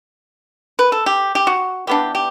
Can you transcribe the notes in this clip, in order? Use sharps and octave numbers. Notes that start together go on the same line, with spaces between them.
B4
A4
G4
G4
F#4
E3 B3 D4 G4
G4